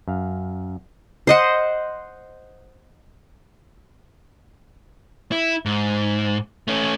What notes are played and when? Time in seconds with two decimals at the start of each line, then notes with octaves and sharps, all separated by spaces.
0.08 F#2 F5
1.27 C5 D#5 F#5
5.32 E4
5.66 G#2
6.68 A3 C#4